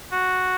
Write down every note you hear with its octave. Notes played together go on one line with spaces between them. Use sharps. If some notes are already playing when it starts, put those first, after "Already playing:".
F#4